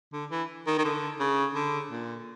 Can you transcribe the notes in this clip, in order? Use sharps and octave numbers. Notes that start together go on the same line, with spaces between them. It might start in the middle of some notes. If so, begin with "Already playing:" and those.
D3
E3
D#3
D#3
D3
C#3
D3
A#2